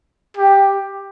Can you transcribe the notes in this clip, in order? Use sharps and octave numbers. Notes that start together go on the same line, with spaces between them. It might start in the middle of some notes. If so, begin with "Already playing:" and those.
G4